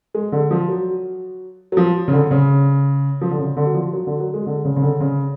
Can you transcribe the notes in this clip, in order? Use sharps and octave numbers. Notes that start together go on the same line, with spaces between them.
G#3
D3
F3
F#3
F#3
F3
C#3
D3
C#3
F3
D3
C#3
D3
F#3
F3
F#3
D3
F#3
G#3
D3
C#3
C#3
D3
C#3